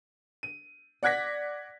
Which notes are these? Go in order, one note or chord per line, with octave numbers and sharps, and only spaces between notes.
D#7
D5 F#5 F#6 G#6 A#6 B6